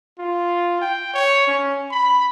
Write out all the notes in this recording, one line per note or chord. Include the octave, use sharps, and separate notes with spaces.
F4
G5
C#5
C#4
B5